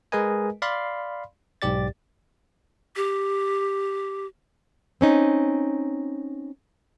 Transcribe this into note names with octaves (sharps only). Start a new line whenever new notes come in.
G#3 G#4 A#4 B4 D#5 G#5
D5 F5 B5 C6
B1 G#2 G4 D5 A6
G4
C4 C#4 D#4